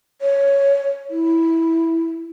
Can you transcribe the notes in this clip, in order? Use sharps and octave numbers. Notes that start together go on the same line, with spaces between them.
C#5
E4